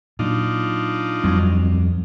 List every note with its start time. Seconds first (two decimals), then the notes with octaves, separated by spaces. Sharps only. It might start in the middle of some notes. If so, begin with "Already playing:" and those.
0.19 A#2 F#3 D4 D#4 F4
1.24 D1 F2 F#3 G3 C4